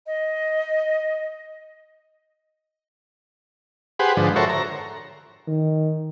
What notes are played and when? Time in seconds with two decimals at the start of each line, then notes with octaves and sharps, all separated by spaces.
0.07 D#5
3.99 G4 G#4 B4 C5 F#5
4.17 G#2 D3 F3
4.36 F#4 A4 A#4 C5 C#5 E5
4.49 A#5
5.48 D#3